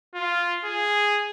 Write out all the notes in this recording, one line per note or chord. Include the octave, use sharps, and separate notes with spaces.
F4
G#4